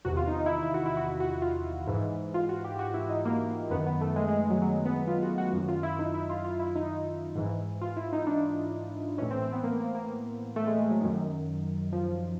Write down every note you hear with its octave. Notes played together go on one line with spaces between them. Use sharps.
E2 C3 D#3 F#4
F4
D#4
D#4
E4
D#4
E4
F#4
E4
F#4
F#4
F4
G#2 E3
F4
F#4
G4
G4
F#4
E4
D#4
A#3
F#2 D#3 B3
B3
A3
G#3
G#3
F#3
F#3
B3
F4
F#4
F#4
F#2 D#3 F#4
F4
E4
D#4
E4
F4
F4
E4
D#4
G#2 E3
F4
E4
D#4
D4
A2 E3 C#4
C4
C4
B3
A#3
A#3
A#3
A3
G#3
G#3
F#3
F#2 D#3
F3